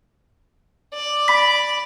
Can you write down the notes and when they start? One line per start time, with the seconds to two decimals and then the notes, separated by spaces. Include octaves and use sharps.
0.94 D5
1.28 B5 B6